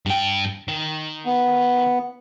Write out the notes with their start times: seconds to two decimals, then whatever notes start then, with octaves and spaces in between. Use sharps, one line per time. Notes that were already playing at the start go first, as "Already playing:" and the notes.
0.06 G2 G5
0.68 D#3
1.26 B3